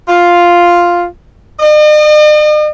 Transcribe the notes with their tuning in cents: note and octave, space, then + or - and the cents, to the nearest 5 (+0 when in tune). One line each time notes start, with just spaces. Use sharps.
F4 +0
D#5 -45